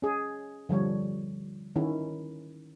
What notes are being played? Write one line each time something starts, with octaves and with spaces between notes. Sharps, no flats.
C#4 G#4
D3 F3 G3 C#5
D#3 C#4 E4